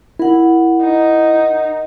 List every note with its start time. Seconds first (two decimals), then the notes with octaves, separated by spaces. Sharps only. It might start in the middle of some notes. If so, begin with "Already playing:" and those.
0.19 E4 A#4 F#5
0.81 D#4